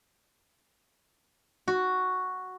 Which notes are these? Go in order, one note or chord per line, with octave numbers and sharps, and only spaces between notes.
F#4